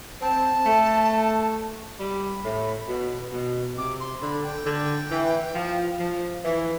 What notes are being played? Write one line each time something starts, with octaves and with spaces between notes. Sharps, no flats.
C4 A5
A3
G3 B5
A2
B2
B2
C3 D6
C6
D3 B5
G5
D3
E3
F3
F3
E3 E5